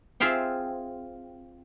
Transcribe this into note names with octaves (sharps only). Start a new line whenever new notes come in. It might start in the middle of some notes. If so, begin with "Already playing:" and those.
C4 F4 G#4 E5 F5 G5